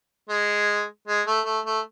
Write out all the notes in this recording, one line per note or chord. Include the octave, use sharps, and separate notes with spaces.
G#3
G#3
A3
A3
A3